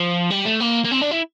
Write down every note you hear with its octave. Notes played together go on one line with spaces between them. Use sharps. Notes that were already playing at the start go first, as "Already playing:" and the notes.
Already playing: F3
G3
A3
A#3
A#3
C4
D4
E4